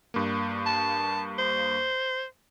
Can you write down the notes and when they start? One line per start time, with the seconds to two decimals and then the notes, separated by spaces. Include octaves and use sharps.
0.14 G2 A#3
0.66 A5
1.38 C5